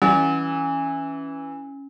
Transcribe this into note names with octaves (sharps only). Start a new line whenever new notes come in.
E3 G3 C#4